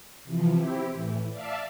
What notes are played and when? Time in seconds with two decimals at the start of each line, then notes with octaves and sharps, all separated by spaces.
0.24 C3 E3 F3
0.56 C4 E4 G4
0.92 A2 E3
1.30 D5 E5 F5 A5